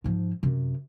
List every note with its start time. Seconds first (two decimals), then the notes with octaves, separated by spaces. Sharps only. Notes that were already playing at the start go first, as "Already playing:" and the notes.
0.04 G#2 F3
0.43 F#2 C3